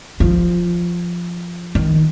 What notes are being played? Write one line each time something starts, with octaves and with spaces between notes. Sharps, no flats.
F3
D#3